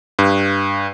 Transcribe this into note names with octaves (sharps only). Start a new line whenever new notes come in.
G2